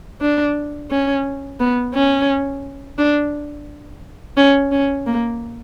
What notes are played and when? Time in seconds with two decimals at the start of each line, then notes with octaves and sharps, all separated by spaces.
0.21 D4
0.90 C#4
1.59 B3
1.94 C#4
2.98 D4
4.37 C#4
4.71 C#4
5.06 A#3